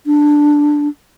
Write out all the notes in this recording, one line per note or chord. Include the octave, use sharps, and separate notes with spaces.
D4